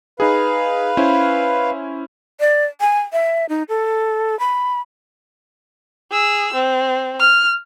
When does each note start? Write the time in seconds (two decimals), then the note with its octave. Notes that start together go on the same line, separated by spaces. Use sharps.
0.20 D#4 G#4 B4 F5
0.97 C#4 E4 C5
2.40 D5
2.81 G#5
3.13 E5
3.49 D#4
3.69 A4
4.39 B5
6.11 G#4 E6
6.54 C4
7.19 F6